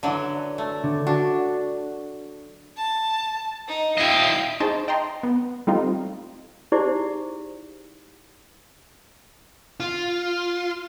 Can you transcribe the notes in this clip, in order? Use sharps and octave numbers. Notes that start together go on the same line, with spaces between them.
D3 E3 F#3
A3
D3
D4 F#4
A5
D#4
E4 D#5 F5 G5
D#4 G#4 C5 D#5 A5 C#6
D#5 G5 A5 A#5 C6
B3
G3 A3 C4 D#4 F4
D#4 E4 G4 G#4 C5 D5
F4